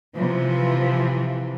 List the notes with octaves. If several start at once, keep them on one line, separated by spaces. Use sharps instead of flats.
C3 E3 F3